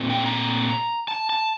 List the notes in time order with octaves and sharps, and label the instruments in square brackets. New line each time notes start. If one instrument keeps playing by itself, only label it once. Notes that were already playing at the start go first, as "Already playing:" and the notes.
Already playing: [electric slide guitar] A#2 A3 C4
G5
A#5
A5
A5